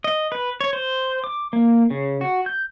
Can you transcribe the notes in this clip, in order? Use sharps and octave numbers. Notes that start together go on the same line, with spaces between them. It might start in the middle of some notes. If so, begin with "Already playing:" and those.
D#5
B4
C#5
C5
D6
A#3
C#3
F#4
G6